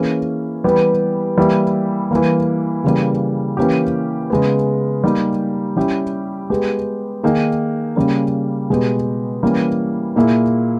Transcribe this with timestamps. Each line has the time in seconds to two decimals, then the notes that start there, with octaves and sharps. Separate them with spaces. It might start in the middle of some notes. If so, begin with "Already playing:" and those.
Already playing: E3 A#3 C#4 G#4
0.64 E3 G3 B3 G4
1.37 E3 G3 A#3 E4 G4
2.11 E3 G3 A#3
2.84 C#3 E3 G3 A#3
3.57 E3 A#3 C#4 G4
4.30 C#3 G#3 B3
5.04 G3 A#3 D#4 G4
5.77 G3 C#4 E4 G4
6.50 G#3 B3 G4
7.23 D#3 A#3 D#4 G#4
7.96 C#3 G3 A#3 C#4
8.70 B2 G#3 B3 G4
9.43 E3 G3 A#3 C#4
10.16 A#2 A#3 E4 G#4